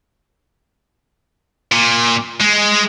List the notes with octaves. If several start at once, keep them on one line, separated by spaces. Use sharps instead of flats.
A#2
G#3